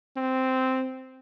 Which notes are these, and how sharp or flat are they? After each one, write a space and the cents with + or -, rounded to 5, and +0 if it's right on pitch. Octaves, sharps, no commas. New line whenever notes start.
C4 -5